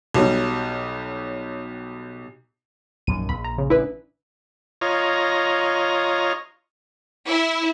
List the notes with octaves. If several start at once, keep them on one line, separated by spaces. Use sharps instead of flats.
B1 F#3 G3
A#1 F#2 D#3 D#7
A#1 B5
A#5
C#3
A1 D4 E4 B4
F4 C#5 D#5 A#5
E4